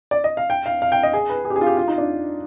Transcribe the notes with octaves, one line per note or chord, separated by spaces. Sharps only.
D5
D#5
F5
G5
F5
F5
G5
D#5
G#4
B4
G#4
G4
G#4
F4
G4
F4
D#4
D4